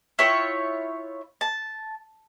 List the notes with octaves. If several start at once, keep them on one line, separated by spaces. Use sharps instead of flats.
E4 F4 C#5 G5
A5